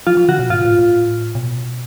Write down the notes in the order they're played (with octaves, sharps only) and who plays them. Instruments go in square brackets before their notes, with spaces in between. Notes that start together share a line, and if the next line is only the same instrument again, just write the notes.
[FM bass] F3 [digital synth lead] F4
[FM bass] F3
[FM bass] D3 [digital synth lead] F#4
[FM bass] B2
[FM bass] G#2 [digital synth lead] F4
[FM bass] A2
A2
B2